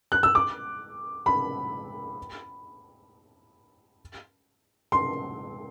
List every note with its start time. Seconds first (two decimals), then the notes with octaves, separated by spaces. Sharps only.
0.12 F#6
0.23 E6
0.35 D6
1.26 B5
4.92 C6